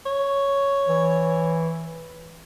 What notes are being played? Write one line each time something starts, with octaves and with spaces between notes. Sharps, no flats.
C#5
E3